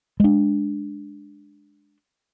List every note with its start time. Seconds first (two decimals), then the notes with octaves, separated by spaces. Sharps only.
0.20 G#3 D4